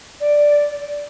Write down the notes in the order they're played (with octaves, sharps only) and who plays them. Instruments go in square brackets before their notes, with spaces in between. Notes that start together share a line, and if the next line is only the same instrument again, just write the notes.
[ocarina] D5